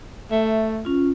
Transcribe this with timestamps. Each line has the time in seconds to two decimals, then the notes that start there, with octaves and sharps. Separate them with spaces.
0.31 A3 E5
0.85 C#4 F4